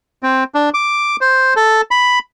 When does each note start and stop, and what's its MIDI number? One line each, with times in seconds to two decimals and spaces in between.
0.23 0.44 60
0.55 0.69 62
0.74 1.16 86
1.21 1.54 72
1.56 1.81 69
1.91 2.19 83